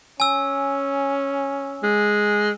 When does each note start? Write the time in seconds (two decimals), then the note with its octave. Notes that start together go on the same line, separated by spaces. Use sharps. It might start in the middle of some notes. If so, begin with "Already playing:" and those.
0.20 C#4 G#5 E6
1.83 G#3